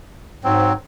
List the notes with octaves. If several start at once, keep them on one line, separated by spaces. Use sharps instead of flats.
G#2 F#3 C4